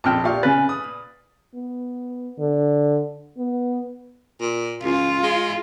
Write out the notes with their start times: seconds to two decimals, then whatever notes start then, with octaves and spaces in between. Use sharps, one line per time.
0.04 A#1 F2 F#4 A4 B4 G5 A5 F6
0.24 A#2 F4 G4 D5 E5 F5 C#6
0.43 C#3 B3 C#4 B4 G#5 A6
0.69 E3 F3 A3 D#6
0.84 A#2
1.55 B3
2.39 D3
3.38 B3
4.40 A#2
4.83 C#2 F4
5.23 G#3